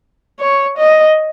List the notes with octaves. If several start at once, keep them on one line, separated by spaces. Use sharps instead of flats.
C#5
D#5